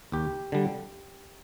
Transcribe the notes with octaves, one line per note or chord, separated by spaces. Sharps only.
D#2 G4
D3 G3